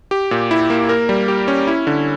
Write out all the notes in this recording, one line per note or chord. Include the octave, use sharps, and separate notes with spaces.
G4
A#2
E4
A#3
A#4
G3
G4
C#4
E4
D3